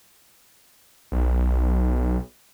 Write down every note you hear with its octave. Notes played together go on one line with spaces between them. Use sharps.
B1